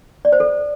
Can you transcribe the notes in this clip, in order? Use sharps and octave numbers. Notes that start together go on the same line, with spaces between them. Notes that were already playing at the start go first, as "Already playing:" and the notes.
D5
C5
A4